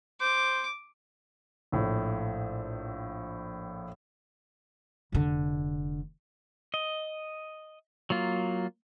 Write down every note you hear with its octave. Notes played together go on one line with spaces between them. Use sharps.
C5 D6
A#1 A2
F1 D3
D#5
F#3 A#3 F4